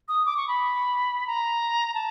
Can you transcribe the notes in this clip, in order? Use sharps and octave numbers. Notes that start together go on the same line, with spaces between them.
D#6
D6
C#6
B5
A#5
A5